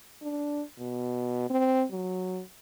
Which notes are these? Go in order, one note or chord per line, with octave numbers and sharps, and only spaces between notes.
D4
B2
C4
F#3